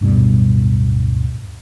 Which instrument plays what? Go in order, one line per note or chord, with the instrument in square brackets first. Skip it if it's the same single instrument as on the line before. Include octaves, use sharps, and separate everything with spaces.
[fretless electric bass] D1 G2 B2 G3